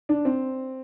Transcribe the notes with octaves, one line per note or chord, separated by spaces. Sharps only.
D4
C4